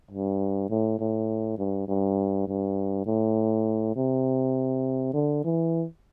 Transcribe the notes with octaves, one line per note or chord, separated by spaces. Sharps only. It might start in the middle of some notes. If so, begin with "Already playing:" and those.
G2
A2
A2
G2
G2
G2
A2
C3
D3
E3